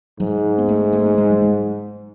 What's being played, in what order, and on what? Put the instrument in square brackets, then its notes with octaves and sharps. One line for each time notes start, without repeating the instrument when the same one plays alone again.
[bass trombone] G#2 [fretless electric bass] F#3
[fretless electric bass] B3
A3
A3
A3
G#3
F#3
G#3